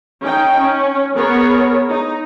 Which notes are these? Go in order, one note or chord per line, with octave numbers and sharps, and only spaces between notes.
C#4 D#4 G5
C#4
B3 G#4 A#4 C#5
D#4